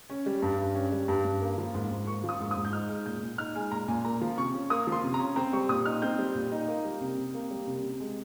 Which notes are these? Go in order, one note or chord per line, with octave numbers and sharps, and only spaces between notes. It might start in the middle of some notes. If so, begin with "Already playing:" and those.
C#4
G3
G2
G2
C#4
G3
G2
G2
A#3
F3
G#2
G#2
A#3 C#6
F3
D#6
G#2
D#6
G#2
G6
D#4 F6
G#3
A#2 G6
A#2
D#4 F6
G#3 G#5
A#2 A#5
A#2 G#5
A#3 A#5
F3
C3 C#6
C#4
A#3 D#6
F3
C6
C3
A#5
C#4
C4 A#5
G3 C#6
A#2 D#6
D#4 F6
C4 G6
G3
A#2
D#4
A#3
G3
C3
C3
A#3
G3
C3
C3
G#3